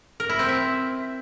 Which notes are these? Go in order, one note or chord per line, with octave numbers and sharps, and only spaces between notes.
A#4
E4
C4
E5